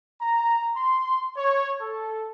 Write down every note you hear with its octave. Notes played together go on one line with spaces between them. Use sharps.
A#5
C6
C#5
A4